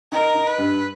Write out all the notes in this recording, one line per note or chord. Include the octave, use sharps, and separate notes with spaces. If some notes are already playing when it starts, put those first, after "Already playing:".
D#4 A#4
D#4
B4
G2